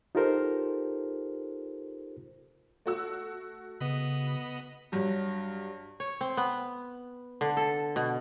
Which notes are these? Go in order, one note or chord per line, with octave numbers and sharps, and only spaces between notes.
D#4 F4 G4 A4 A#4 C5
A3 F#4 E6
C#3 B3 D#5 B5
G2 F#3
C#5
C4
B3
D3
A4
B2